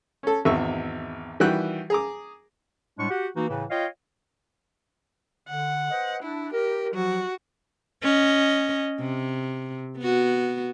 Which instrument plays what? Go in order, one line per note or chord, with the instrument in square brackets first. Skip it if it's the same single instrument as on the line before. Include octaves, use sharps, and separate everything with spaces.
[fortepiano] C#4 A4
G#1 E2 E5 C#6
D#3 E3 G3 F#4 G5 F#6
G#4 A#5 D6
[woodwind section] A2 G3 G#3 D4 C#6
F#4 G4 F#5
E3 A#3 D#4 F#4
A2 C#3 E3
F4 C#5 D#5 F5 G5
[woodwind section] D3 [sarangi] F#5
[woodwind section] B4 C5 D#5
[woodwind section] D4 [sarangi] E4
[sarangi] G4 [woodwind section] A#4
[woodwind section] F3 F#3 [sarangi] F#4
[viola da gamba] C#4 D#5
C3
B3 F#4